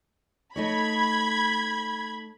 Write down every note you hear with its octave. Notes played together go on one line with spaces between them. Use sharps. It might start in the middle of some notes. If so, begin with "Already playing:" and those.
A3 D#4 C#5 B5 G#6